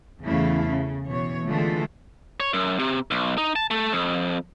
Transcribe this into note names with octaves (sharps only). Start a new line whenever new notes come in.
E2 C#3 A3 E4 F5
C#3
B2 E3 C#5
D3 E3 G#3 A3 F4 A4
C#5
F#2
C3
B1
D#4
A5
A3
F2